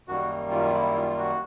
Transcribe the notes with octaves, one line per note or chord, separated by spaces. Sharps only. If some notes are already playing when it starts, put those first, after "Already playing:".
F#2 D#3 G3 A#3 F#4
F4
E4
F4
F#4